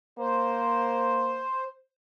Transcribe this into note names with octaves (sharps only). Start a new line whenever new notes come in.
A#3 C5